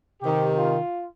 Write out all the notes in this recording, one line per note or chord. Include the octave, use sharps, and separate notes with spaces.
C3 D#3 G4
F4